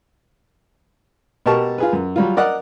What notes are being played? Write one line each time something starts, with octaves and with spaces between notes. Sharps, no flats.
B2 G4 A#4 A5 C#6
F4 G#4 B4
F#2
F#3 G3 F4
A#4 D5 D#5 F#5